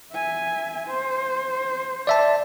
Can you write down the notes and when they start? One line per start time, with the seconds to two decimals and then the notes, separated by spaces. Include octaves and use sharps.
0.13 E5 G#5
0.87 C5
2.07 D5 E5 A5